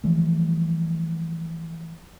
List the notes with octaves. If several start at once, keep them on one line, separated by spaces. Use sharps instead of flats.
E3 F3 G3 A3